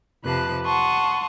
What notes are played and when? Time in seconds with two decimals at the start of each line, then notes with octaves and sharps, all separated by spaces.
0.24 F2 C3 F3 B4 A5 F#6
0.65 F#5 A5 C6 C#6 D#6